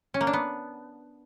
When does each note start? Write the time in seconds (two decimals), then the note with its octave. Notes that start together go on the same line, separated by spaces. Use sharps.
0.14 C#4
0.21 A#3
0.27 D4
0.33 B3